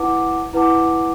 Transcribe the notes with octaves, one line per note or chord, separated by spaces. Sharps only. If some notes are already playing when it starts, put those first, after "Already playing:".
Already playing: E4 B4 F#5 A5 D6
E4 B4 F#5 A5 D6